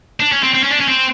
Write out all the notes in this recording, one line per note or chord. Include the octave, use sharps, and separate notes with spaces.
D4
C#4
C4
C4
C#4
D4
C#4
C4